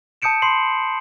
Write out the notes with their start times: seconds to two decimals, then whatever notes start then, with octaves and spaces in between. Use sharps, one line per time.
0.22 A5 D#6 G6 C#7 D7 E7
0.42 B5 C6 C7 F#7